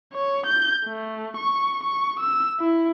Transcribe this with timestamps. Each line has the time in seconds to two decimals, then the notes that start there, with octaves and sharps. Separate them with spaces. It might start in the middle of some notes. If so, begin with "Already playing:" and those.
0.15 C#5
0.47 G6
0.86 A3
1.37 C#6
1.84 C#6
2.20 E6
2.60 E4